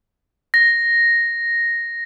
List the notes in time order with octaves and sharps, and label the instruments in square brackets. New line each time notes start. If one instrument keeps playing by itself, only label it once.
[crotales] A#6